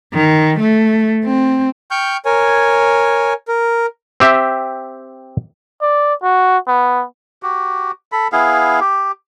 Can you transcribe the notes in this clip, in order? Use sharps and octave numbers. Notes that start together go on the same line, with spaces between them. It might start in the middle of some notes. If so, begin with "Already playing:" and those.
D#3
A3
C4
G5 C#6 F6 G6
A#4 C#5 G#5
A#4
C4 G4 E5
D5
F#4
B3
F#4 G4
A4 B5
B3 E4 G#4 F5
G4